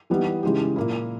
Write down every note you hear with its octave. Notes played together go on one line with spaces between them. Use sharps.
E3 G3 B3 D#4 G4
C#3 E3 G#3 D#4 G4
A#2 A#3 E4